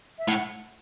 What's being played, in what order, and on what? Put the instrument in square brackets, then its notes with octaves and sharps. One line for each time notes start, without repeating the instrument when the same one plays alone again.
[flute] E5
[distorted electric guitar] A2 [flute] F#5